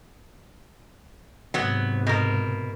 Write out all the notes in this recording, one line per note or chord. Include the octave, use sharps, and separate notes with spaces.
G#2 C3 F#3 B3
B2 A#4